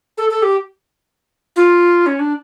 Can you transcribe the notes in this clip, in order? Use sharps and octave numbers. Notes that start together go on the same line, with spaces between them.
A4
A4
G4
F4
C#4
D4